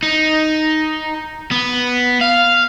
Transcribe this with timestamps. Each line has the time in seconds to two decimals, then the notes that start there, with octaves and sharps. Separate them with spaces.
0.03 D#4
1.51 B3
2.21 F5